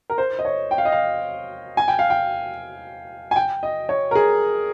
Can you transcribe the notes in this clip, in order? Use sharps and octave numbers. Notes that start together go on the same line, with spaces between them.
A#4
C5
D#5
C#5
G5
F5
D#5
F5
G#5
G5
F5
G5
G#5
G5
D#5
C#5
A#4
G#4